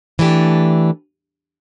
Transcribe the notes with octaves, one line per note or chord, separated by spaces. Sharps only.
E3 A3 D4 G4